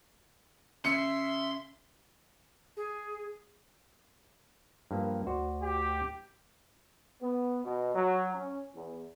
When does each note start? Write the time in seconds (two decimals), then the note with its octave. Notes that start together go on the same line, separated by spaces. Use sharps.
0.85 C#3 E5 C6 C#7
2.77 G#4
4.91 G2 F3 A#3
5.27 D2 F#4 C5 D5
5.62 G4
7.21 B3
7.65 B2
7.94 F#3
8.34 C#4
8.74 E2